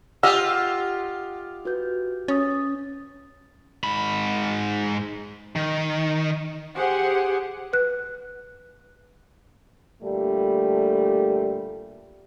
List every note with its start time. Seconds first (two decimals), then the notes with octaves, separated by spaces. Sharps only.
0.23 F4 G4 D#5 F#5 E6
1.65 F#4 B4 G6
2.28 C#4 D#6 A6
3.84 G#2 B5
5.56 D#3
6.75 G4 G#4 C5 F#5
7.73 B4 F#6
10.03 A#2 D3 G3 A3 G4